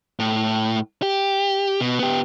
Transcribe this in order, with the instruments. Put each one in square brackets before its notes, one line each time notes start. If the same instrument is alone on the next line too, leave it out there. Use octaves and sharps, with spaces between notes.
[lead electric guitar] A2
G4
B2
B3 G4